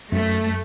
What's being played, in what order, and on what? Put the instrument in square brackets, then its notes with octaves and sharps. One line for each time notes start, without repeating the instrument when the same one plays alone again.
[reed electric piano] F#2 [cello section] A3